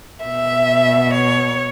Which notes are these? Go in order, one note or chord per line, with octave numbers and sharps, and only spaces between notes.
B2 E5
C#5